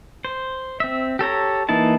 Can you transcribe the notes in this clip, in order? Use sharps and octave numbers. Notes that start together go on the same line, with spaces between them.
C5
C4 E5
G4 A4 C#5 A#5
E3 A#3 D#4 E4 A5